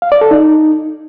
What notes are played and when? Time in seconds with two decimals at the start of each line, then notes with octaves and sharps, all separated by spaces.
0.02 F5
0.12 D5
0.21 A4
0.31 D#4